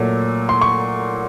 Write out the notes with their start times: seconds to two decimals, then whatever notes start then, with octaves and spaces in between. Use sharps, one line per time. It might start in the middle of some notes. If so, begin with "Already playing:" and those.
Already playing: A#2 F#3 A3
0.49 C6
0.61 C#6